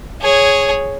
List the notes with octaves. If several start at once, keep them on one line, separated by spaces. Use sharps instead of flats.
G#4 C#5